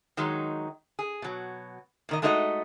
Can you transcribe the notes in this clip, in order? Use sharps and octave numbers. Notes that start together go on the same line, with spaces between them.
D#3 F#3 G#3 D#4
G#4
B2 F#3
A#2 D#3 D#5
G#3 A3 D#4 F#4 D5 D#5